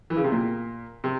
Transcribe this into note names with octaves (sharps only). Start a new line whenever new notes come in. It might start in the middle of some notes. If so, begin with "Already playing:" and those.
E3
C#3
C3
A#2
C3